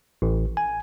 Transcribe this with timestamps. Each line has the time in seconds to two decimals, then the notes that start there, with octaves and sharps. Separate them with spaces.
0.22 A1
0.57 G#5